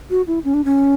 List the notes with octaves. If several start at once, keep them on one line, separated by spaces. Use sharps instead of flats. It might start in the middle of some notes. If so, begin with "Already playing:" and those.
F#4
E4
C#4
D4
C#4